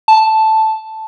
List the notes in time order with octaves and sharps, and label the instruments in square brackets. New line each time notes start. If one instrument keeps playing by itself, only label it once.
[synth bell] A5